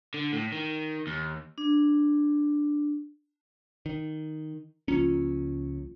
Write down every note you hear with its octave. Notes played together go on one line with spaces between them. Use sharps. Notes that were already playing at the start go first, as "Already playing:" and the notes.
D3
A2
D#3
D#2
D4
D#3
C#2 F3 A#3 C#4 F4